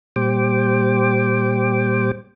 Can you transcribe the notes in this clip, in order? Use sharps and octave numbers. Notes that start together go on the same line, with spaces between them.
A#2 G3 C5 G5 D6